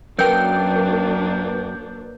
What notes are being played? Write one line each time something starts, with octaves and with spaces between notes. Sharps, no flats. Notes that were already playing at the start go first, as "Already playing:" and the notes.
F#2 F#3 A#3 D4 A#4 B4 G5 G6